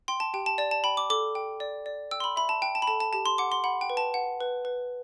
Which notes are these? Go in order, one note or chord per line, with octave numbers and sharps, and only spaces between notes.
G5 C6
A5
G4 G5
A5
D5 A5
A5
G5 B5
D6
A4 D6
G5
D5
D5
G5 E6
C6
B5
E5 B5
A5
G5
A5
B5
A4 A5
A5
G4 A5
C6
F#5 D6
C6
F#5 B5
G5
B4
A5
F#5
B4
B4